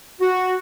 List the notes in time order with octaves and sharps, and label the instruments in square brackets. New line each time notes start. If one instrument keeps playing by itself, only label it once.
[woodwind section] F#4